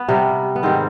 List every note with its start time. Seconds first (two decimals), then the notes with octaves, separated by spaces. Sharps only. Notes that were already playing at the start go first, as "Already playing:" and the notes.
Already playing: B3
0.08 C3 G3
0.56 B3
0.63 G#2 D#3 G3 C4